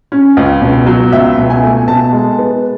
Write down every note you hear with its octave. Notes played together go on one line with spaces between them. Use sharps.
C#4
C#2
B2
F#3
C#2 E5
B2
G#5
A3
B2 A5
G#3
B3